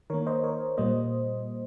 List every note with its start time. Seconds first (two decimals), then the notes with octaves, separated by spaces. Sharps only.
0.10 D#3 A#3 A#4 C#5
0.27 C5 D#5
0.43 A#4 C#5
0.78 A#2 G3 A#3 C5 D#5